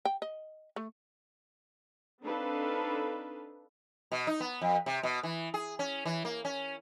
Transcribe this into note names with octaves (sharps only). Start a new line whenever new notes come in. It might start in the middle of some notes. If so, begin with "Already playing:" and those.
G5
D#5
A3
C4 D4 D#4 A4 B4 F5
B2
D#4
B3
F2
C3
B2
E3
G#4
C#4
E3
A#3
C#4